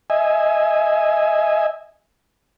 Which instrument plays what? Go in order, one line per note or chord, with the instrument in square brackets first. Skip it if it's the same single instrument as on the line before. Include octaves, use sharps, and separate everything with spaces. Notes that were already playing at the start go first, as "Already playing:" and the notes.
[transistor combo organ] D#5 E5 G#5